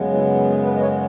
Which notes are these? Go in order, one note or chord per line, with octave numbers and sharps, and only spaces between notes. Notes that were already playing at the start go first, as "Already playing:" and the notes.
Already playing: F#2 C#3 G#3 B3
E4
G#4
B4
D#5
C#5